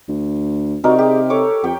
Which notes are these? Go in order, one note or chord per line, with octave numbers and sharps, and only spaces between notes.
D2
C3 D#4 F#4 A#4 D5
G4 G#4
A4 C#5 D6
F2 G4 G5